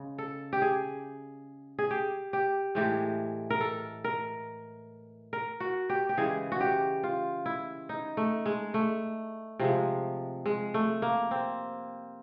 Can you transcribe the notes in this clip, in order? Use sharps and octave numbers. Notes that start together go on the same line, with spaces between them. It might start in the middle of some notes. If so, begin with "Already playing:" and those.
Already playing: C#3 G#3
A4
G4
G#4
G#4
G4
G4
A2 E3 G#3 G4
A#4
A4
A#4
A#4
F#4
G4
G4
C#3 E3 G#3 G#4
F#4
G4
F4
E4
D#4
A3
G#3
A3
C3 F3 G#3
G#3
A3
A#3
C4